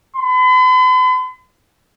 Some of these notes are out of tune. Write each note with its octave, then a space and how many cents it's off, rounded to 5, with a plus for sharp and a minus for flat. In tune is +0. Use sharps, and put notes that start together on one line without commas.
B5 +45